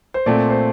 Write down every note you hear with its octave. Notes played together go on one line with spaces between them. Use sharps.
C5
A#2 A3 C4 D5
C5